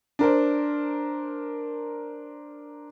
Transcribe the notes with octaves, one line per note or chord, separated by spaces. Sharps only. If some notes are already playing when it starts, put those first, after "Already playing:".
D4 A#4 C5